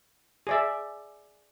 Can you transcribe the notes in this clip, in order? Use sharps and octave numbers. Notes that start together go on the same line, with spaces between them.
G#4 D5 E5